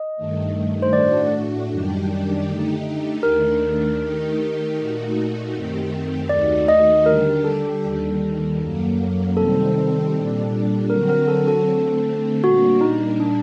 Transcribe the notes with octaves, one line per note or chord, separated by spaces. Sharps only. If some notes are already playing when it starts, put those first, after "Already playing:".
Already playing: D#5
G2 D#3 A3
C5
A2 A3 D4 F#4 D5
F#2 D#3 G3 D4 G4
D3 A3 D#4 G4
D#2 D#3 A3 D4 A#4
D#3 A3 D#4 G4
A#2 A3 D#4 F#4
F#2 D#3 A3 C4 G4
D#2 D#3 A3 D#4 F#4 D5
D#5
D3 G3 D4 G4 A#4
A4
D#2 D#3 G3
F#2 F#3 A#3
C3 D#3 G3 C4 A4
A#2 G3 D4
D3 F#3 C4 F#4 A#4
A#4
A4
A4
D3 A3 C4
A#2 G3 A#3 D4 F#4
D#4
D4